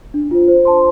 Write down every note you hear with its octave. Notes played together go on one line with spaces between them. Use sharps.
D4
F4 C5
C5
A5 C6